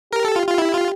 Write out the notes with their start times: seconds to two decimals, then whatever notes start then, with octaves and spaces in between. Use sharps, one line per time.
0.13 G4 A#4
0.25 A4
0.36 F4
0.47 F4
0.58 E4
0.74 F4